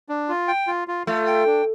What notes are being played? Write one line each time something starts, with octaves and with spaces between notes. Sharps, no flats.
D4
F4
G5
F4
F4
A3 F4
G5
D4